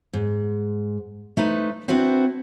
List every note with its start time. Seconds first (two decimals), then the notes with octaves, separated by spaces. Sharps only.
0.13 G#2
1.37 A3 D#4 B4 C5
1.88 C4 D4 E4 F#4 B4 C5